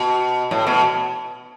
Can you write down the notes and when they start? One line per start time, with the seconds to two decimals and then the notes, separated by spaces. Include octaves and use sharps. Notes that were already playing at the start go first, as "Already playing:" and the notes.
Already playing: B2
0.51 A2
0.67 B2